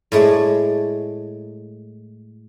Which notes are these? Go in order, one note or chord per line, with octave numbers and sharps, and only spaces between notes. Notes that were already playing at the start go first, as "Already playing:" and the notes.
A2 G#3 A3 G#4 D5